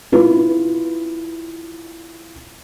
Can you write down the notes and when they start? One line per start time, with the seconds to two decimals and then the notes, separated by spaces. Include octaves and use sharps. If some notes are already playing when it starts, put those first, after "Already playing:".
0.12 E4 F4 B4